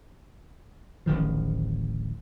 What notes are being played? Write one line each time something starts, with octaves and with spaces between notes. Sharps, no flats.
D1 A1 D#3 F3